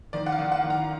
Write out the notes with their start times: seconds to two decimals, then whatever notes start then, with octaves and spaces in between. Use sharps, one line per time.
0.13 D#3 D5
0.26 F#5
0.32 F5
0.39 D#3
0.52 F#5
0.64 D#3
0.70 A#5